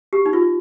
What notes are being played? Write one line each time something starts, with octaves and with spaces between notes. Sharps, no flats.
G4
D#4
F4